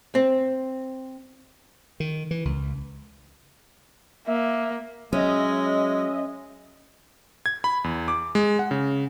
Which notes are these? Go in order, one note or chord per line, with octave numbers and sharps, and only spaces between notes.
C4
D#3
E3
C#2
A#3 E5
F#3 G#3 C#4 D#5 E5
G#6
B5
E2
D6
G#3
F#5
C#3